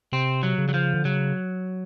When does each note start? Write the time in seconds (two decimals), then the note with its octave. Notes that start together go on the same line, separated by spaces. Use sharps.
0.12 C3 C4
0.43 F#3
0.58 C#3
0.69 F#3
0.74 F3
0.94 D3
1.05 C#3 F#3